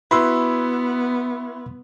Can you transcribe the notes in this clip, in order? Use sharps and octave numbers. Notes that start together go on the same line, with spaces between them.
B3 E4 F#4 B4 B5 C6 E6